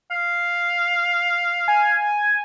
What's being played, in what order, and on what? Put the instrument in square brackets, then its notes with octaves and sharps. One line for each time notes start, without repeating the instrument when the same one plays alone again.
[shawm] F5
[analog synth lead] G#5